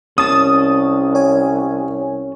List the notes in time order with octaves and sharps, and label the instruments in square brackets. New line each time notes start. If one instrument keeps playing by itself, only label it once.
[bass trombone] C2 [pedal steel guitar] C#4 A5 [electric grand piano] D#6
[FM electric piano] C#5 G#5